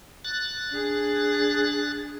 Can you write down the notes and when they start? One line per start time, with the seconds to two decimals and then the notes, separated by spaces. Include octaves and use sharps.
0.25 F#6 A6
0.70 D4 G#4